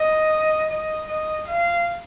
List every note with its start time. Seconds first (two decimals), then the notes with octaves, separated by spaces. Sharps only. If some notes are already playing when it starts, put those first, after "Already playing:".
Already playing: D#5
0.70 D#5
1.08 D#5
1.47 F5